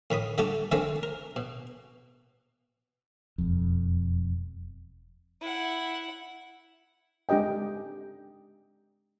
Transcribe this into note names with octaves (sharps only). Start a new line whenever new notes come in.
A2 D#3 B5 D#6
D3 G3 A3 F#4 G4 A4
D3 D#3 G#3 A3 C4 D4
A#4
B2
E1 F2
E4 F#5
G#3 D4 G4 D#5 G5